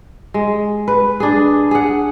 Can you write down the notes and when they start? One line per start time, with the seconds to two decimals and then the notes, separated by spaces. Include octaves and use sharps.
0.34 G#3
0.88 B4
1.20 D4 G#4
1.71 G#4 F#5